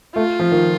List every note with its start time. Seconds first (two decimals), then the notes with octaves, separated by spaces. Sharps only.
0.16 A3 F4
0.40 F3
0.52 D#3